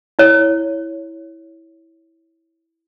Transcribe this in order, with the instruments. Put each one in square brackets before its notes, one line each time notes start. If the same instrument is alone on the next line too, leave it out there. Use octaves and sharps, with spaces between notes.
[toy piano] E4 C#5